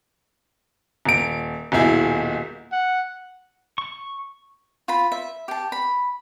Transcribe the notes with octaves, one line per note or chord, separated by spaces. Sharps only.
D#1 D7
D#1 B1 E4 G#4
F#5
C#6
F4 B5
E5
G4 A5
B5